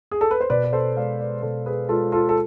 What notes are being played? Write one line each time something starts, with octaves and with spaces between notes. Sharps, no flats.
G#4
A4
B4
C5
B2 B4 D5
B4
A4 C5
G#3 D5 F5
B4 D5
B2 A4 C5
G#4 B4
G#3 F4 A4
F4 A4
A4